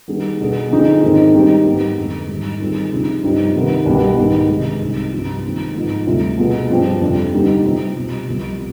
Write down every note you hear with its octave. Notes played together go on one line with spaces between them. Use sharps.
D#3 G3 B3 D#4 G#4
B2 B3 D4 G#4
D3 F3 C4 D#4 G#4
G#2 D#3 G#3 C4 D#4
D#3 G3 C4 D#4 G4
G#2 G3 B3 D#4 G4
F2 D3 G#3
G#2 D#3 G3
D#3 G3 C4 F4 G#4
C3 F3 C4 D#4
G2 F3 C4 D#4 G4
C3 D#3 B3
C2 B2 B3 D4 G4
G#2 D#3 B3 D4
C3 D#3 G#3
C2 C3 G3 C4 D#4
G2 F3 B3 F4
D#3 G#3 C4
G#2 F3 B3
D2 C3 G3 D4 F4
B2 B3 F4 G#4
G2 F3 C4 G4
F2 C3 G3 D4
D3 G3 B3 D#4 G4
C3 G3 C4 F4
B2 G3 C4
C2 C3 F3 B3